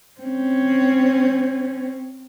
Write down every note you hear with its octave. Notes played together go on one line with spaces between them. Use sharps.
C4 C#4